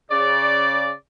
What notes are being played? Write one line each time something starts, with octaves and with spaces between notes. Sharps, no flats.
C#3 D5